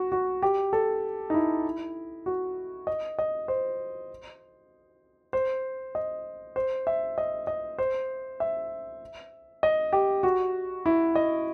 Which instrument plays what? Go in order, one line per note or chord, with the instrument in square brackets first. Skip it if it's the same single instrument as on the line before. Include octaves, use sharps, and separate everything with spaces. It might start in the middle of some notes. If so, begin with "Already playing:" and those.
Already playing: [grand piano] F#4
F#4
G4
A4
D#4
E4
F#4
D#5
D#5
C5
C5
D#5
C5
E5
D#5
D#5
C5
E5
D#5
G4
F#4
E4
D#5